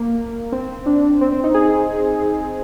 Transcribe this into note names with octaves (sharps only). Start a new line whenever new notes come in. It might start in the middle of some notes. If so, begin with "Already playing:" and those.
Already playing: A#3
C4
D4
C4
C4
D#4
G#4